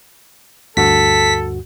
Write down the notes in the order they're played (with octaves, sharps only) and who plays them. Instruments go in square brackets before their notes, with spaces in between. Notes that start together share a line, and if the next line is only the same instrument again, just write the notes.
[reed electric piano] D2 G2 F#4 [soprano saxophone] A4 [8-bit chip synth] B6